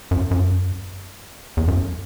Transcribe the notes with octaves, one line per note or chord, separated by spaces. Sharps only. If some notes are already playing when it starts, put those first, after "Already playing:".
F#2
F#2
E2
F#2